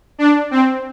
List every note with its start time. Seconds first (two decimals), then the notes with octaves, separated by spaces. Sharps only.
0.18 D4
0.51 C4